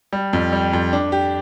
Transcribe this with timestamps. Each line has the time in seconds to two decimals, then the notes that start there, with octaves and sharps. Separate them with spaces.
0.13 G3
0.33 F2
0.52 G3
0.73 F2
0.93 D4
1.12 G4